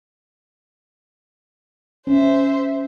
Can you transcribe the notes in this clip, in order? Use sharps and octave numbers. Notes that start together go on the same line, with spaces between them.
C#4 C5 E5